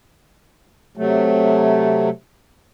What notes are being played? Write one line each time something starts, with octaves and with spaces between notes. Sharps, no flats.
C3 F#3 A3